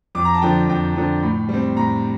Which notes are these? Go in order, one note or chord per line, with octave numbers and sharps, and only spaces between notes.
F2 D6
A#5
A5
D3 F3 G5
F2 G5
D3 F3
A2
G3
C4
A2 A#5